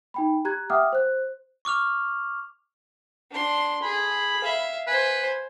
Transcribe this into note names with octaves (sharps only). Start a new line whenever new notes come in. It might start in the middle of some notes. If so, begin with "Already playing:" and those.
D#4 G5 B5
G4 A#5 F#6 G#6
E5 F#5 G5 D6 D#6 F6
C5 F#6
C#6 D6 F6 F7
D4 C6
G#4 B5
E5 F5
B4 C5 G#5